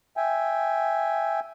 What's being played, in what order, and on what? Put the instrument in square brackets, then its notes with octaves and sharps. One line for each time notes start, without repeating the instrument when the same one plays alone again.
[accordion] E5 G5 G#5